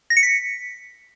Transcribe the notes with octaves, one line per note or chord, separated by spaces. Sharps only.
A#6
C#7
B6